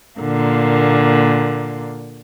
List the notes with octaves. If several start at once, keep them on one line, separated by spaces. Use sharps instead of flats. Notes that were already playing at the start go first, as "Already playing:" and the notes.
A#2 D3 A#3